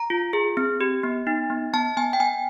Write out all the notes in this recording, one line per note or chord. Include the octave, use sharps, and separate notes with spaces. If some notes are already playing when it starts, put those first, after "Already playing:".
Already playing: A#5
F4
G#4
C4
G4
B3
D#4
B3
B3 A5
B3 G#5
G5
B3 G#5